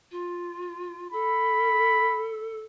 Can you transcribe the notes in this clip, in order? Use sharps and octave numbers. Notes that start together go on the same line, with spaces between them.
F4
A4 B5